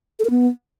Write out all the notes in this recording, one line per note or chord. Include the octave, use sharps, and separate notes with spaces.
A4
A#4
B3